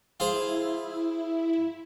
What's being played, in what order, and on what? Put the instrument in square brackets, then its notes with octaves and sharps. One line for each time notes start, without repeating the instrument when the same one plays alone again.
[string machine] E4 [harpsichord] F4 G#4 C5